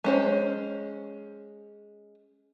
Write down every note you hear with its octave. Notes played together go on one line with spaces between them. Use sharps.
G#3 C#4 C5